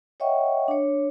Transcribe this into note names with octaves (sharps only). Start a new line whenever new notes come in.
C#5 D#5 E5 F#5 G5 C#6
D4 C#5